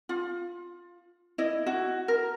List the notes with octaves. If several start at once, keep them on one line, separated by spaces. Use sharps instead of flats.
F4
E4 D#5
F#4
A#4